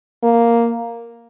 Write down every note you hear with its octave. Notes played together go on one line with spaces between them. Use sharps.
A#3